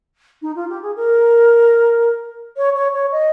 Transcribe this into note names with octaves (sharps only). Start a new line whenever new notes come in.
D#4
F4
G4
G#4
A#4
C#5
C#5
C#5
D#5